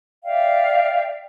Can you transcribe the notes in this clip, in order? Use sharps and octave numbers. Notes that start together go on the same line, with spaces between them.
D5 E5 F5 G5